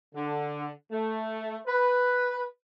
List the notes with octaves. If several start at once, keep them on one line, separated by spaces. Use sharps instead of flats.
D3
A3
B4